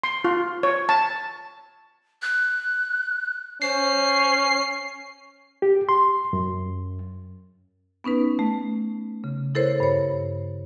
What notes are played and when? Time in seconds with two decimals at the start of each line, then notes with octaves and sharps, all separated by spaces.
0.04 C6
0.24 F4
0.63 C#5
0.89 A5
2.22 F#6
3.62 C#4 C5 C7
5.62 G4
5.89 C6
6.33 F#2
8.04 B3 C#4 D#4 B4
8.39 A3
9.24 C#3
9.55 E4 A4 A#4 C5 C#5
9.80 G2 C#5